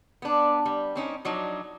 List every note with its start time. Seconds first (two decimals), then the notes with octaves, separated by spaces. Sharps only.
0.22 B3 D4
0.65 G3
0.95 C4 C#4 D#4
1.25 F3 F#3 D4 D#4